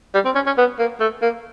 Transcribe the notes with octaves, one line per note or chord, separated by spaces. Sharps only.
G3
C4
C#4
C#4
B3
A#3
A3
A#3